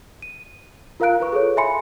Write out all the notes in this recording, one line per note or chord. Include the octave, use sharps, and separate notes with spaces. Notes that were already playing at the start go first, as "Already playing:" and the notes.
D#7
F4 A#4 F5 A#5 F#6 D7
F4 B4 C#6
G#4 A4 C#5
E5 G#5 B5 C6 C#7